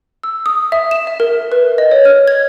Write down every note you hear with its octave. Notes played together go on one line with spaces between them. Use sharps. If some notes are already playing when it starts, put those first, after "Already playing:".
E6
D#6
E5
E7
E5
A#4
B4
D#5
C#5
F6
G#6